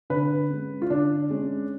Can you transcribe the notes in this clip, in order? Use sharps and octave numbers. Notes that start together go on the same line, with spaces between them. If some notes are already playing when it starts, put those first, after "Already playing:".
D3 B4
G#3 C#4
F4
D3 D4
G#3 C#4